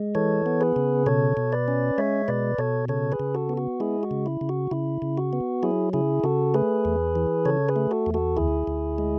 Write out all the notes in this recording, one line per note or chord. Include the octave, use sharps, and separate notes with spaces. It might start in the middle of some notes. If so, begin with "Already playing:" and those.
Already playing: G#3
E3 A4 C#5
B3
G#4 B4
C#3
B2 A4 C#5
B2
B4 D5
C#4
G#3 C#5 E5
B2 B4 D5
B2 A4 C#5
C#3 A4 C#5
G#4 B4
C#3
F#4 A4
B3
F#4
G#3 E4 G#4
F#4
C#3
E4
C#3
F#4
C#3 E4
C#3
F#4
B3
F#3 E4 G#4
C#3 E4 G#4
C#3 F#4 A4
A3 G#4 B4
E2
E3
C#3 A4 C#5
G#4 B4
A3
F#4 A4
E2
F#4 A4
D2 E4 G#4
D2
G#3